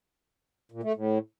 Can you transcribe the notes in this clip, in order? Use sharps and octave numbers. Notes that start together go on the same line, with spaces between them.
A#2
A3
A2